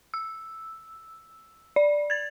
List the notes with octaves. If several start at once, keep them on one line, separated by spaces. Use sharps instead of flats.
E6
D5
G#6 A6